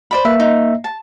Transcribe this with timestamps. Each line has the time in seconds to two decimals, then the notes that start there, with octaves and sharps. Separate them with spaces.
0.11 C5 D5 B5
0.25 A#3 B4 E5
0.40 D#4
0.84 A5